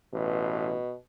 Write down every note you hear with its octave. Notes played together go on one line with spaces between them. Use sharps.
A1 B2